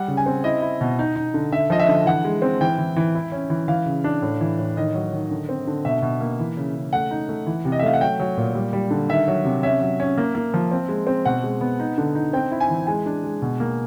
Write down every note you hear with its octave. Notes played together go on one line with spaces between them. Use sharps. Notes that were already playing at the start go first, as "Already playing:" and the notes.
Already playing: G3 F#5
C#3
G#5
C4
E4 D#5
E4
B2
D#4
D#4
D3
D3 E5
F3 D#5
E5
D3
E3 F#5
G#3
C4
E3 G5
E3
E3
E4
C#4
E3
E3 F5
C#3
D4
A2
E3
A2
D#3 D#5
F#3
D#3
D3
C4
D3
B2 E5
B2
A#3
E3
C#3
C#3
A3 F#5
D#4
A3
E3
C3
D#5
E5
A3 F5
F#5
F#3 G5
F#3
A#2
G3
G3
D3
D#3 E5
F#3
C3
C#4 E5
F#3
C#4
A#3
A#3
F3
C4
G#3
C4
B2 F#5
G#3
B3
D#4
D3
D#4
C4 G5
E4
G#5
E3
G#3 G#5
D4
G#3
B2
A#3